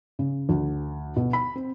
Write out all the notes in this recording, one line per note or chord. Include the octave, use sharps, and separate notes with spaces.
C#3
D2
B2
B5
C4